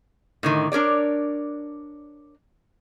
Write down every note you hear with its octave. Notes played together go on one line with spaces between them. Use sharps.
A2 D3 D#3
D4 A#4 C#5 D5